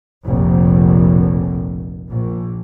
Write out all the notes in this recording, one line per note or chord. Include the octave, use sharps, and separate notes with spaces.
F1 A#1
A#1